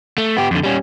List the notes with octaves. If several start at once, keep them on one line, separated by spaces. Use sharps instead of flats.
A3
B3 G4
F2 D3
G3 C#4